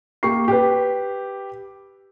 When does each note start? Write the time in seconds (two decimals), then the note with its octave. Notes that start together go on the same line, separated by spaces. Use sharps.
0.23 A#3 G4 C#6 C7
0.48 G4 B4